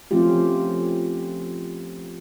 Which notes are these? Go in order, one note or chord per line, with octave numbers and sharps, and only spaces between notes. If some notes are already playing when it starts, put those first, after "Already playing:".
F3 A3 C4 C#4 F4 G4